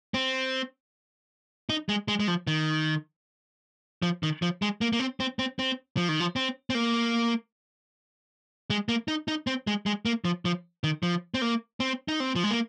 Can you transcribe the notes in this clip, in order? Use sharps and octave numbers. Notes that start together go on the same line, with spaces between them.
C4
D#4
G#3
G#3
G#3
F3
D#3
F3
D#3
F3
G#3
A#3
A#3
C4
C4
C4
C4
F3
D#3
F3
C4
C4
A#3
G#3
A#3
D#4
D#4
C4
G#3
G#3
A#3
F3
F3
D#3
F3
C4
A#3
C4
D#4
C4
F3
G#3
A#3